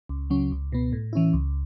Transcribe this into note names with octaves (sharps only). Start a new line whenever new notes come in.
C#2
C#3 F#3 C#4
C#2
B2 B3
A2
E3 C#4 E4
C#2